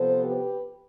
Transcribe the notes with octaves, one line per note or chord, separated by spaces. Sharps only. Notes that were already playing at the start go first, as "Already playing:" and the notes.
Already playing: C3 F3 B3 A4 C5
G4 B4